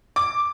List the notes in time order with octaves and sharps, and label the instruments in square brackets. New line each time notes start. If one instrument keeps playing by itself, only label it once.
[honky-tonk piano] D6